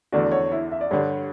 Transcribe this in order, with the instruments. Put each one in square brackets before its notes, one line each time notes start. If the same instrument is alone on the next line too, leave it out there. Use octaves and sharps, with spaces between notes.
[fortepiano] E2 D3 A3 D4 F#4 [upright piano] D5
[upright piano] C#5
E4
E5
D5
[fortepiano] G2 D3 G3 [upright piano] C#5